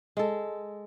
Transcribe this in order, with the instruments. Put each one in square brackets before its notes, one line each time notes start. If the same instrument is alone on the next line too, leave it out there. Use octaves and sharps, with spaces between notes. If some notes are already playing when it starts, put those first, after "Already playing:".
[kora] G#3 A4